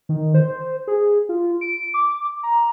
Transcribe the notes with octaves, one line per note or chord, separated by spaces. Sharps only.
D#3
C5
G#4
F4
D7
D6
A#5